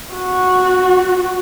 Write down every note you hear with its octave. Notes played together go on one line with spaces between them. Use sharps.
F#4